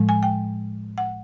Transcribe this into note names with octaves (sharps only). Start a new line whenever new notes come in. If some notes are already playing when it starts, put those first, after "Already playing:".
Already playing: A2 F3 G#3
G#5
G5
F#5